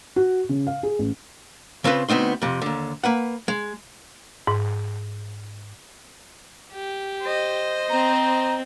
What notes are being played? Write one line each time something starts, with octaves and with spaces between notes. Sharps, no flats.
F#4
C#3
F5
G#4
A1
C#3 C4 F4 B4
D2 B3 C4 D#4 C6
F2 C3
D#2 D3
A#3 B4 F#5
G#3
G#2
G4
C5 D#5
C4 A#5